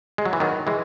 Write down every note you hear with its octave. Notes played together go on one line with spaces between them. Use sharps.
G#3
F#3
E3
D#3 F#3
E3 G#3